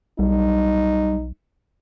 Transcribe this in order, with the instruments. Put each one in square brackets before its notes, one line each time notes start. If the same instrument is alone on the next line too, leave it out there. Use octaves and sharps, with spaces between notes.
[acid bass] B1 [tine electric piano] G3 [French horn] D#4